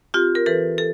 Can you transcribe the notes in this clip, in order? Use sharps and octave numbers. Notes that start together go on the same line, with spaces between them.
C4 F4 G4
A#4
E3 A4 B4
A4